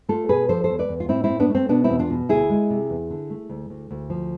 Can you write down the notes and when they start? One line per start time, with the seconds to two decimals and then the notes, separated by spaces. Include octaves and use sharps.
0.09 A3 F4 A4
0.29 B2 G#4 B4
0.49 F3 A4 C5
0.64 A4 C5
0.69 E2
0.79 B4 D5
0.89 E2
1.00 F4
1.09 A2 C4 E4
1.24 C4 E4
1.30 A2
1.40 B3 D4
1.49 A3
1.55 C4
1.69 B2 B3 D4
1.84 C4 E4
1.90 E2
1.99 D4 F4
2.10 B2
2.29 D2 E4 G#4
2.49 G#3
2.70 C3
2.90 E2
3.10 D3
3.30 A3
3.50 D2
3.70 D2
3.91 D2
4.10 F3